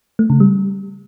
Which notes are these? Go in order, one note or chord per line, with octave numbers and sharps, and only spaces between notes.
A3
C#3
G3